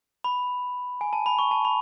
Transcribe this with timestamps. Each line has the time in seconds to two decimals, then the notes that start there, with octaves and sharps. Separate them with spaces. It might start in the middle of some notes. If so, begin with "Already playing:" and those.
0.24 B5
1.01 G#5
1.13 A5
1.26 B5
1.39 C#6
1.51 A5
1.65 B5